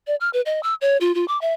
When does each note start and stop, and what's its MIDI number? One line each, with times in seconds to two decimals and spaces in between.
0.07 0.15 74
0.21 0.29 89
0.33 0.41 71
0.46 0.61 75
0.63 0.74 88
0.81 0.97 73
1.01 1.14 65
1.15 1.25 65
1.28 1.40 86
1.41 1.54 76